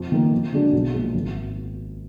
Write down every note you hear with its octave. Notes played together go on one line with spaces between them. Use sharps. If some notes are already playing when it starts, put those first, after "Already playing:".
Already playing: F2
D#3 A#3
F2
D3 G#3 D4 F#4
B1
A#2 F3 G#3
G#1